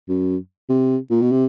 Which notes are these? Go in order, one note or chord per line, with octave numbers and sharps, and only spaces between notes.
F#2
C3
A#2
B2
C3